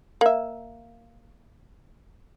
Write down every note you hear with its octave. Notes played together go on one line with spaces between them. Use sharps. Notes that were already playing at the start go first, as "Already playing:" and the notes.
A#3 E5